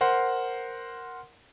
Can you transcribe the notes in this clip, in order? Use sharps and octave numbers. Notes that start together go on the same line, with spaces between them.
A#4 C5 F#5 C6